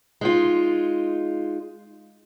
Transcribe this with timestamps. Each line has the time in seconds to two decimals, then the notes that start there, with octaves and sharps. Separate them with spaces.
0.21 G#3 D#4 F4